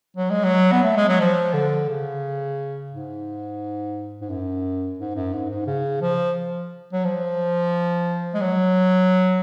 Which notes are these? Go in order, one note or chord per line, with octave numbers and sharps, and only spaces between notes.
F#3
G#3
F#3
B3
A3
G#3
F#3
F3
D3
C#3
G#2
G#2
F#2
G#2
F#2
G#2
G#2
C#3
F3
F#3
F3
G#3
F#3